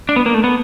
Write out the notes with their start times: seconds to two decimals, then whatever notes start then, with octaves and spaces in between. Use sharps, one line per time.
0.09 D4
0.16 B3
0.26 A#3
0.34 A3
0.44 B3